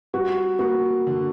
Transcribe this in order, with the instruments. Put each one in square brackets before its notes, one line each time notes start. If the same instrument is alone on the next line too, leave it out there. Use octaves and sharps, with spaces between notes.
[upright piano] G3 [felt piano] F#4
[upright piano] A#3 [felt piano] F#4
[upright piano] D3